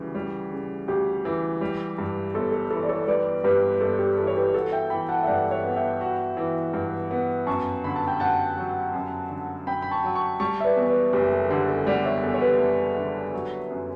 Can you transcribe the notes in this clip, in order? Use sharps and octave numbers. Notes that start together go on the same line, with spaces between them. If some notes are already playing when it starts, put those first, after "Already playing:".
Already playing: D2 C#3 E3 G3
G3
C#3
D2 G4
E3
G3
G2
G1 A4
A4
E3 A4
D5
A4 C#5
G3 B4 D5
G2 G4 B4
G1 A4
G4
E3 A4
C#5
G4 B4
F#4 A4
E5 G5
E3 G5 B5
F#5 A5
E5
G2 D5 F#5
C#5 E5
B3
E5 G5
F#4
E3
G2
B3
F#2 A5 C#6
D3 B5
A5
G5 B5
F#2 F#5 A5
F#3
F#2
D3
F#2 G5 B5
B5
A5 C#6
F#3
A5 C#6
G3 A5 C#6
E5
B4 D5
E2
B4 D5
F#1 G4 B4
A4
D3 G4
A4
G3 D5 F#5
C#5 E5
E2 A4
C#5
G4 B4
F#1
D3
F#3
F#2